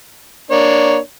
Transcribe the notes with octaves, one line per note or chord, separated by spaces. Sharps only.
A#3 D4 C#5